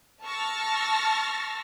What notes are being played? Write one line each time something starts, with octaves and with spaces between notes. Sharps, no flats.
A5 C#6 E6 F6 A6 A#6